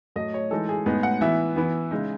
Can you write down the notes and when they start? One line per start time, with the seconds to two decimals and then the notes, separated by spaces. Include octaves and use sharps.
0.16 A2 F#3 A3 D#5
0.34 C#5
0.51 E3 G#3 D#4 A4
0.69 G#4
0.86 A2 G#3 B3 D#4 G#4
1.03 F#5
1.21 E3 B3 E4 E5
1.56 E3 B3 E4
1.91 C#3 G#3 D#4